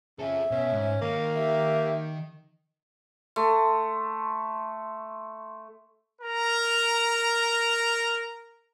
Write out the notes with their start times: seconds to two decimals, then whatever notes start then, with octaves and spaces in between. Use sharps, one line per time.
0.19 C#3 F4 A4 E5
0.51 B2 C#4
0.72 G#2
1.02 D#3 A#3
1.34 G4 E5
3.36 A3 C6
6.22 A#4 A#5